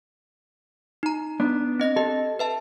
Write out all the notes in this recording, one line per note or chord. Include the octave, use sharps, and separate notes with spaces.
D#4 A#5
B3 D4
C4 D#5 A#6
G4 A4 D#5
B4 E5 A5